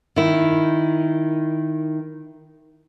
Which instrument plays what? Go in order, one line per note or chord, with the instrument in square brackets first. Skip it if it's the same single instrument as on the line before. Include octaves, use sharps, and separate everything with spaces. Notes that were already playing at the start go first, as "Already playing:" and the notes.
[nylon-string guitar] D#3 E4